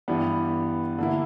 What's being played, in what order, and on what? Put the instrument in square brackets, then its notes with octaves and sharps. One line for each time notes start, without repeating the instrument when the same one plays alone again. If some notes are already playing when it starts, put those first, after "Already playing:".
[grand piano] G2 E3 G3 B3 D4
D3 A#3 E4